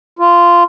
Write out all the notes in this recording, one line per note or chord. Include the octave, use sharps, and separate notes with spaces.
F4